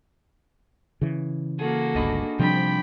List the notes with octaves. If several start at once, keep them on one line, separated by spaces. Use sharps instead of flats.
C#3 E3
A#3 F#4 G#4 A4
G1 C#2 D4 D#5 B5
C3 F3 G3 C4 D4 G5 B5